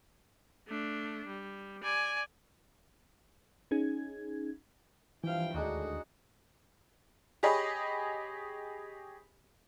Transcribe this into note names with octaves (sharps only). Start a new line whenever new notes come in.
A3 D4
G3
D5 G#5
C#4 D#4 G#4 G#6
G2 E3 F3 E4 F5 G5
D#2 A2 D3 G#3 D4 D#4 F#4 G#4
G4 G#4 C#5 D#5 B5